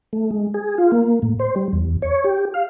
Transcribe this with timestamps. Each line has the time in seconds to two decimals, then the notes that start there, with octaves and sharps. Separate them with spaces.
0.13 A3
0.31 G#3
0.54 G#4
0.78 F4
0.92 A#3
1.22 A2
1.39 C5
1.56 G3
1.73 E2
2.02 C#5
2.24 G4
2.54 F5